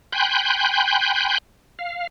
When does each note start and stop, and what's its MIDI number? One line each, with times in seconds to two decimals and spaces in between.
0.13 1.38 79
0.13 1.38 80
0.13 1.38 83
0.13 1.38 84
0.13 1.38 90
0.13 1.38 91
1.79 2.07 77